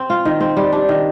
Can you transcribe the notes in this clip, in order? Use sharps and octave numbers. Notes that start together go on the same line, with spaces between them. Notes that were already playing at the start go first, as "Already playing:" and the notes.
Already playing: C4
F4
D#3
C4
G3
D4
D#3